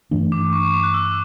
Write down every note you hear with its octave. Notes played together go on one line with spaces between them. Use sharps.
G2 E3 A3 D4
D6
C#6
C#6
D6
F#6
E6